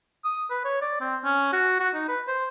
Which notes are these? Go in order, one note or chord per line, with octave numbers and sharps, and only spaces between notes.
D#6
B4
C#5
D5
C4
C#4
F#4
F#4
D#4
B4
C5